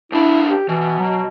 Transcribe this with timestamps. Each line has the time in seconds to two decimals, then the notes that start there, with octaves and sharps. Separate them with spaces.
0.12 B1 D4 E4
0.49 G4
0.69 B2 E3
0.99 F#3